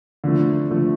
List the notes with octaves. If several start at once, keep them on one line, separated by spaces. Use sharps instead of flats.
D3 F3 A3
D3 F3 A3